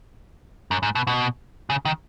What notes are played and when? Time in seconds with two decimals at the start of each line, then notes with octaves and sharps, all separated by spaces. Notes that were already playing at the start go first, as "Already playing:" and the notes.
0.71 F#2
0.83 G#2
0.95 B2
1.07 B2
1.70 C#3
1.85 D#3